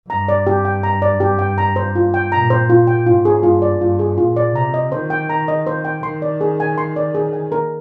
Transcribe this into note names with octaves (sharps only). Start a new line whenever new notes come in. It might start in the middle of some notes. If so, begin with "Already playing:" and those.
G2 A#5
D5
G4
G5
A#5
D5
G4
G5
A#5
C5
F4
G5
A#2 A#5
C5
F4
G5
G#2 F4
G#4
G2 F4
D5
G2 F4
G#4
A#2 F4
D5
C3 A#5
D#5
D#3 C5
G5
A#5
D#5
C5
G5
D#3 C6
D5
G#4
G#5
C6
D5
G#4
G#5
A#4